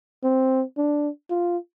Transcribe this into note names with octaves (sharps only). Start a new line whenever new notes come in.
C4
D4
F4